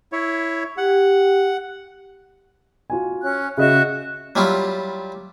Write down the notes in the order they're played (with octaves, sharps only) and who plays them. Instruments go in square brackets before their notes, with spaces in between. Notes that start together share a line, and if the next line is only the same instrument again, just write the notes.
[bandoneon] E4 C#5
[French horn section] G4 [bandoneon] F#5
[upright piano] F4 F#4 G#5
[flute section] C#4 F#6
[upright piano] C#3 D#5 [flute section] F#4 E5 F#6
[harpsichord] F#3 G3 E4 F4